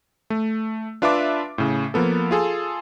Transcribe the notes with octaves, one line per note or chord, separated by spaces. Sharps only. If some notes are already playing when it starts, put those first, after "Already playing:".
A3
D4 F4 B4 E5 A5 D6
A2 C#3
F3 A#3 B3 A4
F4 G#4 A4